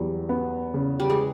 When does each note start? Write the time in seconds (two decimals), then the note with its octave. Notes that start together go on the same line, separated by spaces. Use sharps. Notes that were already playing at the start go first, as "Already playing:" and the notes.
Already playing: E2 F#3 G3
0.29 B3
0.74 C#3
1.00 G3
1.10 G#3